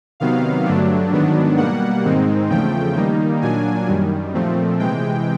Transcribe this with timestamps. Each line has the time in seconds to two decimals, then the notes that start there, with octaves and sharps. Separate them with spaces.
0.20 C3 D#3 F#3 B3 F5
0.65 G2 D3 F#3 A3 D4
1.12 G#2 D#3 F#3 B3 D4
1.57 B2 G3 A#3 F#5
2.04 G#2 D#3 G#3 C4 D#4
2.49 E2 C#3 F3 A3 G5
2.96 D#3 G3 A#3 D#4
3.42 A#2 F#3 A#3 D4 G#5
3.88 F#2 D#3 G3
4.34 A#2 F3 A3 C4
4.79 C3 E3 G#3 G5